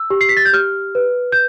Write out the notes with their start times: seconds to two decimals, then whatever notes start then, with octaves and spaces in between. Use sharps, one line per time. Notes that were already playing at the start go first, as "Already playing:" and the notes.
Already playing: E6
0.10 G4
0.21 C7
0.29 B6
0.37 A6
0.45 G6
0.53 G4 F6
0.95 B4
1.32 G6